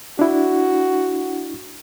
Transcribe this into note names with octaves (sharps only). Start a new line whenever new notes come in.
D4 E4 F#4